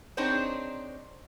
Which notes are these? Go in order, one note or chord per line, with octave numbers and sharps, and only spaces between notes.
C4 D4 D#4 G#4 C5 C#5